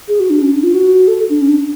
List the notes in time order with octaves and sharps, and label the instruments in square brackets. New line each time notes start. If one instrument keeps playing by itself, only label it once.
[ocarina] G#4
F#4
D4
C#4
D4
F4
F#4
A4
D4
C#4
D4